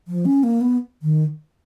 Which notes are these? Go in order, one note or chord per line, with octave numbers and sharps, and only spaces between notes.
F3
C#4
A#3
B3
D#3